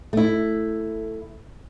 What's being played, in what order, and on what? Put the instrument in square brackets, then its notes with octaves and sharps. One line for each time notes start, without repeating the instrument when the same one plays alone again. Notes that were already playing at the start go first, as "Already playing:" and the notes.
[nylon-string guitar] A3 E4